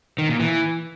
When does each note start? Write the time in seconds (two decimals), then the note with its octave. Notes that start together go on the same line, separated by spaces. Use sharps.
0.18 D#3
0.29 A#2
0.40 E3